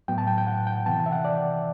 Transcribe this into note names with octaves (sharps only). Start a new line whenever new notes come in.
A2 F#3 B3 G5
A5
G5
G5
F#5
G5
C3 E3 B3 A5
G5
E5
F#5
D5